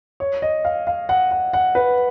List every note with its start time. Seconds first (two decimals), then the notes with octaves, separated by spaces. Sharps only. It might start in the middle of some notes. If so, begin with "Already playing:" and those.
0.20 C#5
0.42 D#5
0.65 F5
0.87 F5
1.09 F#5
1.31 F#5
1.53 F#5
1.75 B4